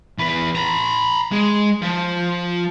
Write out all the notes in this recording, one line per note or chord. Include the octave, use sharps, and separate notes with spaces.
E2 B4
A#5 B5
G#3
F3